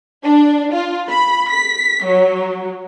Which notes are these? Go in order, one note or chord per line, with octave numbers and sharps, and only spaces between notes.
D4
F4
B5
B6
F#3